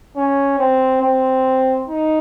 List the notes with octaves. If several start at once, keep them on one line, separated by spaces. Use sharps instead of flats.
C#4
C4
C4
D#4